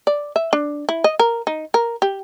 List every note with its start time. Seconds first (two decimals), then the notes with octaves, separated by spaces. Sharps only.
0.07 D5
0.36 E5
0.53 D4
0.89 E4
1.04 D#5
1.19 A#4
1.47 D#4
1.74 A#4
2.02 G4